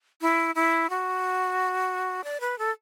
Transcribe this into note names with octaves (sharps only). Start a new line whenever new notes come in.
E4
E4
F#4
D5
B4
A4